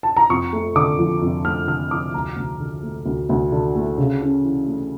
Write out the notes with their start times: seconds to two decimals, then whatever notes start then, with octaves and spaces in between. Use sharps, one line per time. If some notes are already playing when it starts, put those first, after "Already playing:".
0.03 A5
0.17 A#5
0.30 F2 C#6
0.53 A3
0.76 D3 D6
0.99 F3
1.22 F2
1.45 A3 F6
1.68 D3 F6
1.91 F3 D6
2.14 D2 A#5
2.37 D2
2.60 D3
2.83 A3
3.06 D2
3.29 D2
3.52 D3
3.75 A3
3.98 C#3
4.22 C#4
4.45 E3
4.67 A3